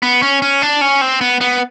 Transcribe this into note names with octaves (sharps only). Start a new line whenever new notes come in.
B3
C#4
C#4
D4
C#4
C4
B3
B3